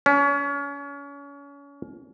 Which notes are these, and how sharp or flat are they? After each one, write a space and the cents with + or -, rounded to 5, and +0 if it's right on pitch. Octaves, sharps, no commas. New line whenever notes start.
C#4 +30